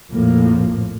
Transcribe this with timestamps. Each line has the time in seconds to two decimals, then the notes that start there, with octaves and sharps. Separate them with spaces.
0.12 A#1 F2 A2 F3 A#3